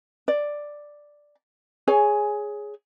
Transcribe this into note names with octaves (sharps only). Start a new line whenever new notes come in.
D5
G#4 C#5 G#5